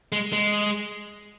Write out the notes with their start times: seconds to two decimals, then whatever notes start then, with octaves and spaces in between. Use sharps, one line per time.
0.12 G#3
0.32 G#3